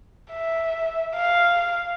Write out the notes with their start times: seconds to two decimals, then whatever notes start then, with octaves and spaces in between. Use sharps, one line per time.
0.32 E5
1.15 F5